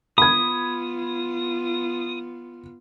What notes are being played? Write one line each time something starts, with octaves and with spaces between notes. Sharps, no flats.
B3 F4 B5 D#6 G#6